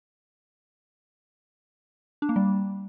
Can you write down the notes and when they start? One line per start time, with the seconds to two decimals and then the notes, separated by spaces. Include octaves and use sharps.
2.22 D4
2.29 A#3
2.36 G3